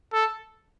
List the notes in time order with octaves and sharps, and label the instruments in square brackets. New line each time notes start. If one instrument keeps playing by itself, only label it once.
[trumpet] A4